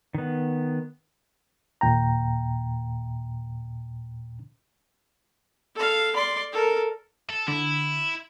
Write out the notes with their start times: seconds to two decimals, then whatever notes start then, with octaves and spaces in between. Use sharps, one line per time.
0.15 D#3 B3
1.81 D#2 A#2 G5 A#5
5.76 A4 F5
6.16 D5 C6
6.52 A4 A#4
7.30 A4
7.48 D3 E4